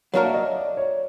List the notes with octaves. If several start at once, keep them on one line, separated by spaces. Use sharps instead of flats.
F#3 A#3 D4 F#4 A#4 D5
E5
D#5
D5
C#5